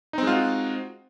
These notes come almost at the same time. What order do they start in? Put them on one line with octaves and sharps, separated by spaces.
D#4 C4 G#3 F4 F#4